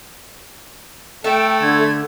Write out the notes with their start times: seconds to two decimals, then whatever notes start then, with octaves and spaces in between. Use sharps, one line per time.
1.24 A3 A4 E5 G5
1.60 D3 G#6